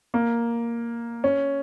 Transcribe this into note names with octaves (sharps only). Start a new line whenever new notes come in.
A#3
C#4